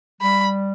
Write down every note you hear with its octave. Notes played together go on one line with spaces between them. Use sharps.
G3 B5